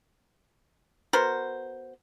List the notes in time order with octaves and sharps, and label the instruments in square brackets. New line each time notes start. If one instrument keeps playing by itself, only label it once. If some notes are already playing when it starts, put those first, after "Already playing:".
[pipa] B3 F#4 A#4 C5